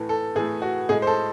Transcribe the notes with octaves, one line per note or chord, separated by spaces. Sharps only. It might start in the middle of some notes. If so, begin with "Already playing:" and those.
Already playing: A2 E3 A3
A4
A2 E3 A3 G#4
F#4
A2 G#3 G#4
C5
A4